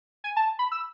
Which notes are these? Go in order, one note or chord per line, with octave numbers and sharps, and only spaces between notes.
G#5
A5
B5
E6